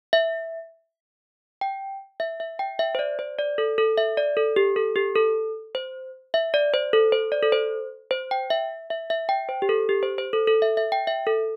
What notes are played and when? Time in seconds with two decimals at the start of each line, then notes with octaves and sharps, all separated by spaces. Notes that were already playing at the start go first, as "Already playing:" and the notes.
0.13 E5
1.61 G5
2.20 E5
2.40 E5
2.59 G5
2.79 E5
2.95 C5
2.99 D5
3.19 C5
3.39 D5
3.58 A4
3.78 A4
3.98 E5
4.17 D5
4.37 A4
4.56 G4
4.76 A4
4.96 G4
5.15 A4
5.75 C5
6.34 E5
6.54 D5
6.74 C5
6.93 A4
7.12 C5
7.32 D5
7.43 A4
7.52 C5
8.11 C5
8.31 G5
8.50 E5
8.90 E5
9.10 E5
9.29 G5
9.49 C5
9.62 G4
9.69 A4
9.89 G4
10.03 C5
10.18 C5
10.33 A4
10.47 A4
10.62 E5
10.77 E5
10.92 G5
11.07 E5
11.27 A4